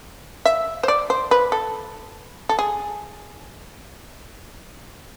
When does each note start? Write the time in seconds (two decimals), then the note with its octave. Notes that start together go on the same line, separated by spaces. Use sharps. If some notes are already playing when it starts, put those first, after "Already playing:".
0.45 E5
0.83 C5
0.88 D5
1.10 C5
1.31 B4
1.52 A4
2.49 A4
2.59 G#4